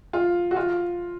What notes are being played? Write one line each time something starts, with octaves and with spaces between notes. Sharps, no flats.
F4
F#4
F4